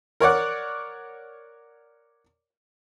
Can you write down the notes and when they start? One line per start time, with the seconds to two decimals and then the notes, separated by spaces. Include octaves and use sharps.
0.20 A#4 C#5 D5 F#5